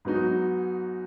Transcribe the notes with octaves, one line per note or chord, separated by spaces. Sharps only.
G#2 F#3 B3 D#4 F#4